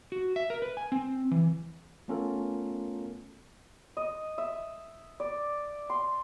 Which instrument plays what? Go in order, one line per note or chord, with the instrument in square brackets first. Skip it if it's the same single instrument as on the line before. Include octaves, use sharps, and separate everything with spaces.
[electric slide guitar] F#4
E5
A#4
B4
G#5
C4
E3
[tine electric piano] A3 B3 C#4 F4 A4 A#4
[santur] D#5
E5
D5
C6